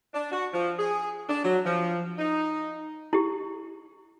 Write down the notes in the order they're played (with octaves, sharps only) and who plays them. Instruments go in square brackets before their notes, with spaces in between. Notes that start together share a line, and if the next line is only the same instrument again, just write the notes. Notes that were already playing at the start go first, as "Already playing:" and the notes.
[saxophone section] D4
F#4
F3
G#4
D4
F#3
F3
D#4
[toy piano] E4 G4